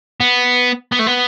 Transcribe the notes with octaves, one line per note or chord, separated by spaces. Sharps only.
B3
B3
A3
B3